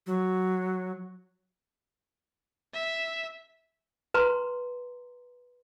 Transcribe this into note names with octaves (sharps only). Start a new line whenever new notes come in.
F#3
E5
B4 A#5 C6